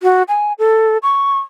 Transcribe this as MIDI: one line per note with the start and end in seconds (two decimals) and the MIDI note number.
0.03 0.23 66
0.28 0.53 80
0.59 0.98 69
1.03 1.39 85